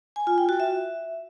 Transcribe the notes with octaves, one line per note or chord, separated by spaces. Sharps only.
G#5
F4
G5
F#4
E5